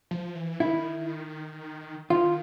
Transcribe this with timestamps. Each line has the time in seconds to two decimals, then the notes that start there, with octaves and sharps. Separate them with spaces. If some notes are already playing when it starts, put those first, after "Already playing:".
0.11 F3
0.35 E3
0.60 D#3 E4
2.10 D#3 F4